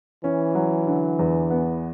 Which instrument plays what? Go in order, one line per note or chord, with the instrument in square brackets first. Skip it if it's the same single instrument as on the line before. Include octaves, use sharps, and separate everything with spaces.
[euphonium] E3 [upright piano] C#4
[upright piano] F#3
D3
E2
B3